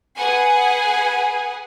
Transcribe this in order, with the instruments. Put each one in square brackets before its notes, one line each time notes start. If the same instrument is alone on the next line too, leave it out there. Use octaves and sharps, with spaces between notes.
[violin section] G#4 B4 F#5 G#5